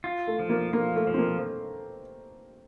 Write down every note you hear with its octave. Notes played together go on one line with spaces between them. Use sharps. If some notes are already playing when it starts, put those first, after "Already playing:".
F4
A3
F3
A#3
A#3 F4
A3
F3
C4
A#3